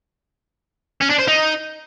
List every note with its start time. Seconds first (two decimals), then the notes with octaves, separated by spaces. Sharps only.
1.02 C#4
1.11 D4
1.20 C5
1.28 D#4